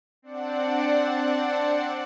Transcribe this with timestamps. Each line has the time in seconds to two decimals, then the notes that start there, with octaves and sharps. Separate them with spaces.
0.22 C4 D4 D5 F#5